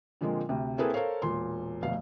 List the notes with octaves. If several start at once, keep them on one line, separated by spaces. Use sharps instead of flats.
A#2 D3 F3 G#3 A#3 C4
D2 C3
A#3 C4 E4 G#4 A4 B4
A4 A#4 C5 C#5 F5
E1 A#2 C6
F1 D2 B2 F5